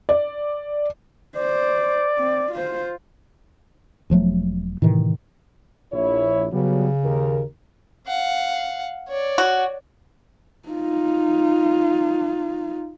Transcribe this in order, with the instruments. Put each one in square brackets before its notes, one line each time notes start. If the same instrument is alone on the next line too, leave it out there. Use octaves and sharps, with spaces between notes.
[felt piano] D5
[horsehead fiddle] C5 [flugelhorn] D5
[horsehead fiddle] C4
F4 C5
[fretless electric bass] E1 F3 F#3 A3
A2 C3 D#3 E3
[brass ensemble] A#1 E4 C#5
[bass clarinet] C#3 [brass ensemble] F#3 G3 B3
[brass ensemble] D#2 A#4
[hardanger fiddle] F5 F#5
C#5 D5
[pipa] F#4
[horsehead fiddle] D#4 F4